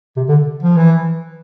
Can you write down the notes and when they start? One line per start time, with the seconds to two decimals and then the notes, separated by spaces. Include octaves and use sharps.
0.17 C3
0.28 D3
0.63 F3
0.76 E3